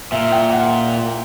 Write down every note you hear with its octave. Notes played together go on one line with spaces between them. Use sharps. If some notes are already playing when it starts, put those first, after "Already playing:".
A#2 E5
G5
F#5